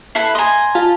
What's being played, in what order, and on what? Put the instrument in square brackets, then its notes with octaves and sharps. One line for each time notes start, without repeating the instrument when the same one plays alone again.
[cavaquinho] E4 A4 B4 [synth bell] C7
[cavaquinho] D#5 G#5 [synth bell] A#5 C6
[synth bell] F4 F5 A5